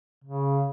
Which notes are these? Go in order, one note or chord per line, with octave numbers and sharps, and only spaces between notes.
C#3